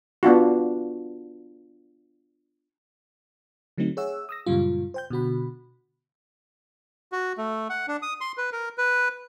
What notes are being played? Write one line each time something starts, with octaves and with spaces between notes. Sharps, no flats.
B3 D4 F4 F#4
D3 F#3 A3 C4 D#4
G#4 C#5 E5 F#5 E6
D#6 E6 A#6
F#2 A#2 C#3 G3 F4
C5 G5 G6
B2 D3 F#4 B5
F#4
A3
F#5
D4
D#6
C6
B4
A#4
B4